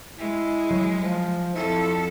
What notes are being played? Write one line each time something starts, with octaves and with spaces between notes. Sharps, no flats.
G#3 E4
F#3
F3
F2 E4 A4